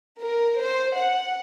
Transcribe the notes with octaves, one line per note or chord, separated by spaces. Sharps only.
A#4
C5
F#5